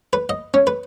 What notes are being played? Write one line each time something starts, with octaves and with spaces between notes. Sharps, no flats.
B4
D#5
C#4
B4